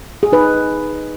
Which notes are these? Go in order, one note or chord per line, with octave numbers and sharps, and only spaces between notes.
G#4
D#4 B4